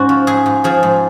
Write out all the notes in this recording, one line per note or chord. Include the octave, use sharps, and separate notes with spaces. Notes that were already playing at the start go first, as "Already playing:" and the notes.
Already playing: G#2 C#4 F#4
F3
G#2 G#4
G#2
F3 G#4
G#2